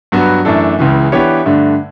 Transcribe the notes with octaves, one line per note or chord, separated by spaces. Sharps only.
G2 F#3 B3 F#4
F#2 E3 A3 D4 A4
C#2 C#3 E3
E3 B3 D4 G4 C#5
G2 D3 A3